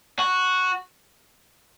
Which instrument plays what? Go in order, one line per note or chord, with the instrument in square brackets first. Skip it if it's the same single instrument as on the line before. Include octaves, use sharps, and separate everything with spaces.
[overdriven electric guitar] F#4